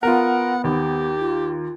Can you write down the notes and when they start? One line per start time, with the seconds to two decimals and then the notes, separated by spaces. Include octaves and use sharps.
0.03 B3 F4 A#4 F#5
0.64 D#2 G4
1.20 F4